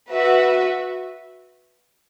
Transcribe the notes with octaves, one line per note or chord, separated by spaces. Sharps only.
F#4 B4 E5